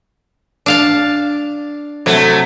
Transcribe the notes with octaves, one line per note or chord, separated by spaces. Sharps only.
D4 F5 A5
C3 F#3 A3